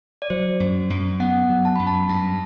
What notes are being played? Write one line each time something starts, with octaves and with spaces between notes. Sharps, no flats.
D5
F#3 C5
F#2
F#2
B3 F#5
F#3
A5
F#2 B5
A5
G2 A5